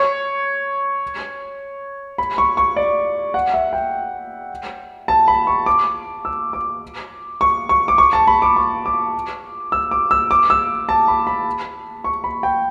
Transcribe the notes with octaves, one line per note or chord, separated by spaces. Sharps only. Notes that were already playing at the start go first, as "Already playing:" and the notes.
Already playing: C#5
B5
C#6
C#6
D5
F#5
E5
G5
A5
B5
C#6
D6
E6
D6
C#6
C#6
D6
C#6
A5
B5
D6
C#6
D6
E6
D6
E6
D6
E6
A5
B5
B5
C#6
B5
G5